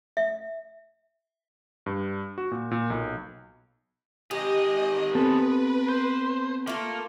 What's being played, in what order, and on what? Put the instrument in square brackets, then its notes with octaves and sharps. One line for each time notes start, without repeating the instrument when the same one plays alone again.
[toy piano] E5
[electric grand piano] G2
F#4
A#2
A#2
B1
[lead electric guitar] D#3 G#4 [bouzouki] G4 [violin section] D#5
[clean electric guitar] B3 C4 A4 [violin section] B4
[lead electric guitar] C5
[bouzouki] A3 F4 [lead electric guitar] A#3